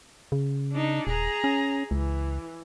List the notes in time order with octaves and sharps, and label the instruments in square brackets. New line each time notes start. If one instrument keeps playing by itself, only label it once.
[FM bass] C#3
[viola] D4 D#4
[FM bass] D#1 [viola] G#4 A#5
[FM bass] C#4
[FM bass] C#2 [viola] E3